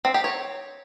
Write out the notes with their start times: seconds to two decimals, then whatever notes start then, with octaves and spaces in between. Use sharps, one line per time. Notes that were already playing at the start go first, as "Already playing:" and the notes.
0.05 C4
0.14 G4
0.24 C#5